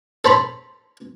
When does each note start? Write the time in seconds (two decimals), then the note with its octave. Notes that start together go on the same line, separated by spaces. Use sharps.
0.25 A4 C5 A#5 B5